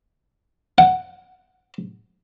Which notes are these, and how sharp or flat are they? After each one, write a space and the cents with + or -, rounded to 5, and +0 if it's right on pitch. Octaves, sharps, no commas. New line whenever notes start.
F#5 +0